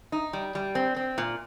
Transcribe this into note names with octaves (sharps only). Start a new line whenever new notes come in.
D#4
G3
G3
C4
C4
A#2